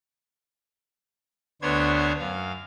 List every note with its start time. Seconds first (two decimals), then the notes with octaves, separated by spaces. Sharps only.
1.62 D2 B3 D4 C5 C#5 G#6
2.19 F#2 F5